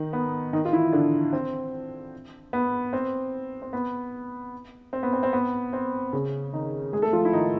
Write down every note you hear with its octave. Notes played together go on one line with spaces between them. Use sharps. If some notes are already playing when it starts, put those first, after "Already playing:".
Already playing: D#3 D#4
B3
D#3 D#4
F4
E3 E4
D3 D4
C4
B3
C4
C4
B3
C4
B3
C4
C4
B3
C4
C#3 C#4
D#3 D#4
G#3 G#4
A3 A4
F3 F4
E4
D#3 D#4